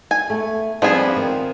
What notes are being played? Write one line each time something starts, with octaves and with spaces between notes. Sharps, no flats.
G#5
A3 B3
F3 G3 B3 C4 D4 G#4
D#3 C4